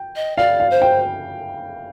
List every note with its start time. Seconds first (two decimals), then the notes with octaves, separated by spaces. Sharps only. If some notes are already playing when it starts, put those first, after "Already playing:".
Already playing: G5
0.16 D#5
0.38 D5 F5
0.60 F5
0.71 C5
0.82 G5